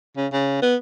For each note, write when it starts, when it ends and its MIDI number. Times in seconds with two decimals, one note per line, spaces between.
0.17 0.27 49
0.33 0.61 49
0.62 0.76 59